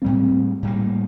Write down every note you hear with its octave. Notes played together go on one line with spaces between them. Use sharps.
A2 G3 A#3 C4
A2 G3 A#3